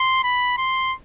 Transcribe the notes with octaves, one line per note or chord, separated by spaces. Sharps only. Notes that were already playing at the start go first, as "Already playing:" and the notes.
Already playing: C6
B5
C6